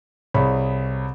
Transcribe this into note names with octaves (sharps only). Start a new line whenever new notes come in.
C2 G#4 C#5 B5